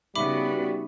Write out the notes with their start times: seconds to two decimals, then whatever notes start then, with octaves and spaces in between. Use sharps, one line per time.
0.15 C#3 G3 B3 D#4 F#4 E5 B5 D6